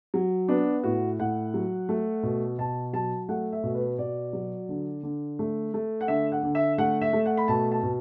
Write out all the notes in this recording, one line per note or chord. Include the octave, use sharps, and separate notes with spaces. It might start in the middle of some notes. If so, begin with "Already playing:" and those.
F#3
B3 D4
A2 F#4
A2 F#5
F#3
A3
B2
B2 A5
F#3 A5
A3 F#5
E5
B2
B4
B2 D5
F#3
D3
D3
A3
A3
F#5
D3 E5
F#5
D3
E5
A3 F#5
E5
A3
F#5
B5
B2 A5
A5
B2